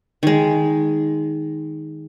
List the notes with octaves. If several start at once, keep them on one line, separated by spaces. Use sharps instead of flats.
D#3 G#3